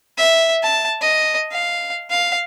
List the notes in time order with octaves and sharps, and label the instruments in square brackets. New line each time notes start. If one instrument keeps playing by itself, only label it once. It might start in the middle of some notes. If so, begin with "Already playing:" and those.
[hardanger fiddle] E5
A5
D#5
F5
F5